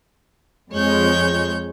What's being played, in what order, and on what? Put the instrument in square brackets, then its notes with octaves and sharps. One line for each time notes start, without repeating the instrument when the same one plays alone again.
[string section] F2 G#3 [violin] C#5 G6